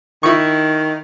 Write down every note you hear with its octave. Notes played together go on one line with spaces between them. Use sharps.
D#3 E4 C#6